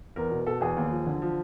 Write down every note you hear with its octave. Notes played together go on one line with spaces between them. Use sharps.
E2 A#4
B2
B2 A4
E2 G#4
D#2
F3
D3
F3